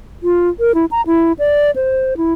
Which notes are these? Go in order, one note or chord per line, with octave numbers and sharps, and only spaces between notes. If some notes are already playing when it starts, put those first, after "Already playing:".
F4
A#4
E4
A#5
E4
D5
C5
E4